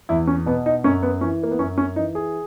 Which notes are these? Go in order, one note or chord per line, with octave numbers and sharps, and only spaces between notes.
E2 E4
C#4
B2 B3
D#4
F#2 C#4
B3
E3 C#4
A#3
B3
F#2 C#4
C#4
E3 D#4
G#4